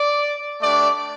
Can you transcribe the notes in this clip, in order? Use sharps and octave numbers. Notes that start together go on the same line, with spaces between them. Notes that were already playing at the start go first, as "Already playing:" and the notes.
Already playing: D5
A3 D4 G4 D5